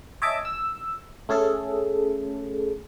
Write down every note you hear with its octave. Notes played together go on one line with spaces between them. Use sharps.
C#5 D#5 E5 G#5 A5 D6
E6
A3 C#4 G#4 A4